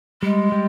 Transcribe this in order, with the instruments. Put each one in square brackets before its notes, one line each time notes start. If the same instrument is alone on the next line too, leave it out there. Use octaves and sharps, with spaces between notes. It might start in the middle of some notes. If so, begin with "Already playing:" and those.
[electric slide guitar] G3 [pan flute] G#3
[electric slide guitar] G3